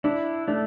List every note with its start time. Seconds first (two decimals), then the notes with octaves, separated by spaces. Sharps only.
0.04 D4 E4
0.48 A3 D4